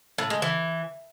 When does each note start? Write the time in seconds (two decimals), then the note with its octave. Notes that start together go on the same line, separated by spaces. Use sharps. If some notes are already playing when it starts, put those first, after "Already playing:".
0.18 A2
0.30 G#3
0.42 E3